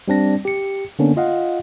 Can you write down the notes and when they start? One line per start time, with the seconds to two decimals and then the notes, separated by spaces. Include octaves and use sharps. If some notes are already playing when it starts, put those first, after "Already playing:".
0.08 G3 C4 D4 A#6
0.45 G4 C#7
0.99 D3 A#3 B3 C#4 D4
1.17 F4 D#5 F5 F#5